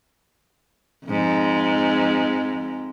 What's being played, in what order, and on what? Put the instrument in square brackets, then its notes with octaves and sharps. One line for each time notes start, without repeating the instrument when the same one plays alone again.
[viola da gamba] F2 G#2